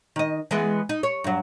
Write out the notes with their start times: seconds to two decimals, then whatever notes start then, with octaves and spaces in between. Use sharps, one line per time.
0.16 D#3 D#5
0.51 E3 G#3 B3
0.89 D#4
1.03 C#5
1.24 G2 F#3